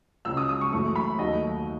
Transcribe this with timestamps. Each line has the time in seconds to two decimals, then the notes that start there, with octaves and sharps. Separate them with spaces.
0.25 C#2 C#3 G#3 E6
0.37 D#6
0.49 D#6
0.61 C#6
0.72 F#1 F#2 E3 A3 C#6
0.96 B5
1.19 D#2 D#3 F#3 A3 D#5